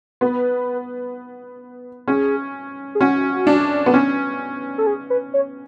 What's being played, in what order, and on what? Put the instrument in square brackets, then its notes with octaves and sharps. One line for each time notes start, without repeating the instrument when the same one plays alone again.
[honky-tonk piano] B3 [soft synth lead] B4
[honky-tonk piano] C#4 [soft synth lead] G#4
[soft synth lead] G#4
[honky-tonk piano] C#4 [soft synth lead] F#4
[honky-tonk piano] D4
B3
C#4
[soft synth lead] A4
G#4
B4
C#5